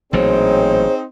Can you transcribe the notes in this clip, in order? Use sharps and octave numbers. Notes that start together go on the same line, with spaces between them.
A1 A#2 F#3 C4 D#4 G#4 C5 C#5